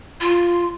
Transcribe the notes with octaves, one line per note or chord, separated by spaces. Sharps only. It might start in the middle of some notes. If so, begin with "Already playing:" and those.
F4